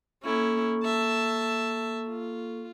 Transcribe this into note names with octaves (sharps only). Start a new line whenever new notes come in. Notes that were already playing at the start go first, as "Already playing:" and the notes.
A#3 C#4 E4 A4 C#6
E5 A5
F4